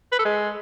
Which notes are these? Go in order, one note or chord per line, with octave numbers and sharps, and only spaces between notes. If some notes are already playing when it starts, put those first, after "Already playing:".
B4
A4
G#3